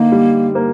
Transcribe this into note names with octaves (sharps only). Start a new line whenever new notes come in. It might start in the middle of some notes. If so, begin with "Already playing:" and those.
Already playing: D3 A#3 D#4
G3
A#3